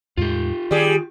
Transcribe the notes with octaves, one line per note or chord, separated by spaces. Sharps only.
E2 A2 G#3 F4 G4
D#3 G3 G#4